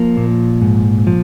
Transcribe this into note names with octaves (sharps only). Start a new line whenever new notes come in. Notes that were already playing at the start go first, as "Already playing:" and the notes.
Already playing: F3 A#3
A#2
G#2
F3